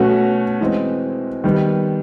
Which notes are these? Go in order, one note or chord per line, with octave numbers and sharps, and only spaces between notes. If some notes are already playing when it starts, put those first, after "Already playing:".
Already playing: B2 F#3 A3 C#4 F#4
E3 G#3 C4
D#3 G3 B3